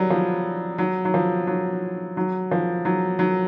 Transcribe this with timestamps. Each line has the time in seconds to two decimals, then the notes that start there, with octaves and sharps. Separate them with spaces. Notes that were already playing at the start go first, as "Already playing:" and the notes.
Already playing: F#3 G3
0.10 F3
0.78 F#3
1.05 F#3
1.14 F3
1.47 F#3
2.17 F#3
2.51 F3
2.85 F#3
3.19 F#3